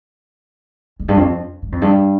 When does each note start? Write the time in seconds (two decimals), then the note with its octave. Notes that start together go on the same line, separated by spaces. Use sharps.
1.00 F2
1.08 G2
1.17 F2
1.62 G2
1.72 F2
1.82 G2